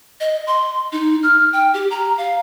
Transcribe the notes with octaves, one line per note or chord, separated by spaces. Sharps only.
D#5
C6
D#4
F6
G5
G4
A#5
F5